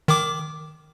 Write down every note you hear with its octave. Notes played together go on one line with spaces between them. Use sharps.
D#3 D6